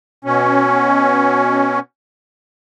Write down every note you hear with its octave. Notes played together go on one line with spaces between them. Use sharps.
B2 C#4